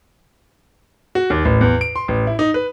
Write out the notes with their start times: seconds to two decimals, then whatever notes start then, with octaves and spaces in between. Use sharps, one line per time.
1.15 F#4
1.30 D#2
1.45 A1
1.61 E2
1.81 D7
1.96 C6
2.08 A1
2.27 E4
2.39 D#4
2.54 B4